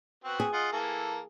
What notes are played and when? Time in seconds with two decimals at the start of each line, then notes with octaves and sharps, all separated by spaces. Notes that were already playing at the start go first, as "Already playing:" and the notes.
0.24 B3 C4 F#4
0.40 G#4
0.53 F4 D#5 F#5
0.72 E3 A#3 A4